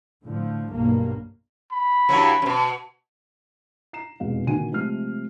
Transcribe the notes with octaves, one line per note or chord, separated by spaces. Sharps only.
A2 D3 F3
B1 G2 A#3
B5
G2 E3 F#3
F#2 B2
A#5 C7 E7
F1 E2 B2 G#3 F5
A#2 D3 D#3 F#4 G#5 D#7
C3 F3 G#3 A3 F6 C7